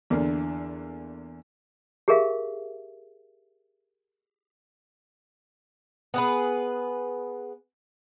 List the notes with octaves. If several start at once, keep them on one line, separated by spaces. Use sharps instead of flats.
E2 D3 A#3 D4
G4 G#4 A#4 E5 F5
B3 G#4 B4